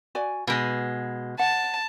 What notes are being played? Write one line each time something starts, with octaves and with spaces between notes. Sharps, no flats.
F#4 D5 G#5
B2 G#3 B4
F#5 A5